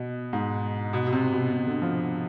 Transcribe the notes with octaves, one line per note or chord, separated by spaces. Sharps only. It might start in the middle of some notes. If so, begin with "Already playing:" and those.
Already playing: B2
G#2
B2
B2
C3
B2
C3
D3
F3